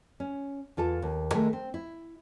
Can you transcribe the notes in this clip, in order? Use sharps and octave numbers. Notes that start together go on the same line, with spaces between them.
C#4
E2 F4 A4 A5
D#2
D#3 G#3 A3 G#4
C4
E4